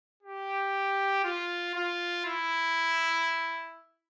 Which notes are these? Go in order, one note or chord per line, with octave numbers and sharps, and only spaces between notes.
G4
F4
F4
E4